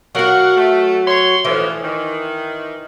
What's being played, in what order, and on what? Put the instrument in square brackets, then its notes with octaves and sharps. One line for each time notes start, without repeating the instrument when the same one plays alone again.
[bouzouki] F#3 F#4 [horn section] A#4 F5 F#5
[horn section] A3
C#5 C6
[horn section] A2 D3 F3 [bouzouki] E3
[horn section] D#3